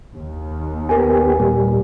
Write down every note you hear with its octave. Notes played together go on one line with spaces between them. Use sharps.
D#2
B3 G4 A#4 G#5
A#2 G3